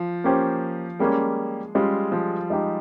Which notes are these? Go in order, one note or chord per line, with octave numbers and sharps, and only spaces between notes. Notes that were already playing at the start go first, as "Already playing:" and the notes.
Already playing: F3
A#3 C#4 G4 C5
G3 G#3 A#3 C#4
G3 G#3 C#4 F4
F3
G#3 D#4 G4